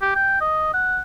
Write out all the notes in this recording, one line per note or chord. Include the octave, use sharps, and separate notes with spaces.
G4
G5
D#5
F#5